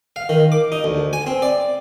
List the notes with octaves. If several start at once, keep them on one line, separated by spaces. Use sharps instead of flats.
F5
D#3
D6
D#4
D2
G#5
C4
D5